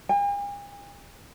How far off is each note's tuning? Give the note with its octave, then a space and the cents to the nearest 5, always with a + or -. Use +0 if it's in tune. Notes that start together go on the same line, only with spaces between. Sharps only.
G#5 -45